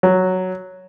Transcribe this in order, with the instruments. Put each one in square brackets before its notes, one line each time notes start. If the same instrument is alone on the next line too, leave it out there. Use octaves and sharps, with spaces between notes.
[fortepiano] F#3